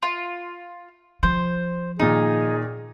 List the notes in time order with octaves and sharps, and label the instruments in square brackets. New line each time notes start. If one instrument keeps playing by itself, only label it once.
[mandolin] F4
[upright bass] F3 [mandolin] C5
[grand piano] A#2 D#3 [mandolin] D#4 [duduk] G#4